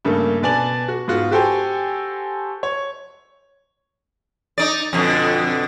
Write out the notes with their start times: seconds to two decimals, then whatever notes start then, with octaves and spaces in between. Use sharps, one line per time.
0.05 G2 C#3 A3 A#3
0.43 B2 B4 D5 G#5 A5 F#7
0.88 F#4
1.08 G#2 B3 F4 F#4
1.31 F#4 G4 A4 C5 G5 G#5
2.63 C#5
4.58 D#4 D5
4.93 F2 B2 D3